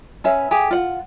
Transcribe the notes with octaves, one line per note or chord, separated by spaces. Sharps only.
C#4 B4 E5
G4 G#4
F4 F#5